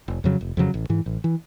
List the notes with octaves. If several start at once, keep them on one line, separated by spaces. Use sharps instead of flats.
F1
F2 C#3 F#3
F1
F2 C#3 F#3
A1
G#2 E3
A1
E3